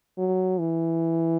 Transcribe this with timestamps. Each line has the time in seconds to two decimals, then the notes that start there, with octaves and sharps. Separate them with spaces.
0.18 F#3
0.60 E3